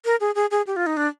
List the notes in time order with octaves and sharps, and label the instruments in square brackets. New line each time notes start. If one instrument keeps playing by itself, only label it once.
[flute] A#4
G#4
G#4
G#4
G4
F4
D#4
D4